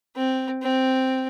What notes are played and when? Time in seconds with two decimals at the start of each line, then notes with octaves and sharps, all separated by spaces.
0.16 C4
0.62 C4